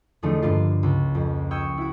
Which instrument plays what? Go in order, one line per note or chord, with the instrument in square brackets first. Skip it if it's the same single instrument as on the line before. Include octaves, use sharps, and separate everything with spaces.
[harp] E2 D3 F3 A3 D#4
G2 D3 A#3 F4 C7
C#2
F2
G5 C#6 D#6 E6 G#6
E4 F#4